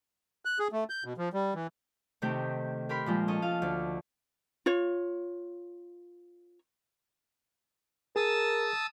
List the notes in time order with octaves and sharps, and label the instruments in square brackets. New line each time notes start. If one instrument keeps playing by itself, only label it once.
[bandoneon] F#6
G#4
A3
G6
B2
F3
G3
E3
[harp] C3 D#3 A3 C4 D#4 G4
G4 A#4 B5 C6
A#2 F3 G#3
C#4 A4 D#5
F4 F5
D2
[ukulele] F4 C#5
[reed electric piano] G#4 [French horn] A#4 [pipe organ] A5 D#6 E6